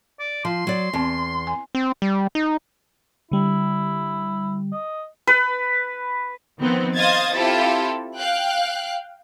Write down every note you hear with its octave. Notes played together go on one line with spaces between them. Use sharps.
D5
F3 C6
F#3 D5
E2 C4 A5
G#5
C4
G3
D#4
D3 G3 E4
D#5
B4
D#3 F3 B3 C4
C5 D#5 F5 D#6 G#6 A6
C4 E4 F4 G4 A4
F5 G5 F#6